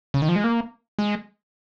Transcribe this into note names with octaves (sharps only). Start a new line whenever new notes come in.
C#3
D#3
F3
G#3
A#3
G#3